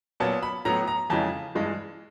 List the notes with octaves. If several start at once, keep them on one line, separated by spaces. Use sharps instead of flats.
A#2 F#3 B3 A5
B5
A2 F#3 B3 A#5
A#5
F2 C#3 E3 G#3 A5
G2 E3 G#3